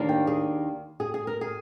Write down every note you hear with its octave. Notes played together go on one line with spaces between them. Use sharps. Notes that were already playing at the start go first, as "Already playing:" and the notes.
Already playing: D#2 D#3 A#3 D4
G5
G#4
G#4
G#4
A#4
G#4